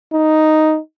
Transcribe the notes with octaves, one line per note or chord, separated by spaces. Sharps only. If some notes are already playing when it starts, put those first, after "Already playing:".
D#4